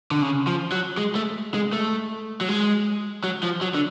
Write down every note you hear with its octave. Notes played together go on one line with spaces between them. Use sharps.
D3
C#3
F3
F#3
G#3
A3
G#3
A3
F#3
G#3
F#3
F3
F#3
D3